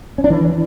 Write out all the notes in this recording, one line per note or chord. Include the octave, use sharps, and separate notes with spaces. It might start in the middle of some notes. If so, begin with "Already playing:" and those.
C#4
D4
E3